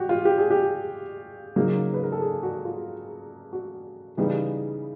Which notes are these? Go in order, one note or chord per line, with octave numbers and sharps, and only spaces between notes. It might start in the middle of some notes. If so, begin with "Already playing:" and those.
Already playing: F#4 G4
F4
G4
G#4
G4
C#3 F#3 A#3 D#4
B4
A#4
A4
G#4
F#4
F4
F#4
C#3 E3 G3 B3 D#4